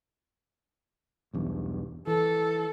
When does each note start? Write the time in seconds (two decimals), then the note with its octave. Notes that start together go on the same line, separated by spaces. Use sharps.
1.34 B1 E2 G2
2.07 E3 A4